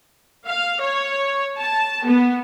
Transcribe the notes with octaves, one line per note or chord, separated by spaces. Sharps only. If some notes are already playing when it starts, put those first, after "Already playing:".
F5
C#5
A5
B3